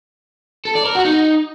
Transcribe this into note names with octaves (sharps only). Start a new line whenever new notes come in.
A4
D5
A#4
F#4
D#4